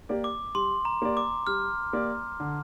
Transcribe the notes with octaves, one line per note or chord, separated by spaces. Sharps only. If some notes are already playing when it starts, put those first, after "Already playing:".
A#3 G4 D5
D6
G3 C6
A#5
A#3 G4 D5
D6
G3 F6
A#3 G4 D5
D3